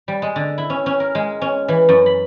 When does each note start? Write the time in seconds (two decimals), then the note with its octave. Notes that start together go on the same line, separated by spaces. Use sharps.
0.08 G3
0.22 G#3
0.36 D3
0.58 E4
0.70 C#4
0.86 C#4
1.00 A#4
1.15 G#3
1.41 C#4
1.68 E3
1.89 F#2
2.06 B5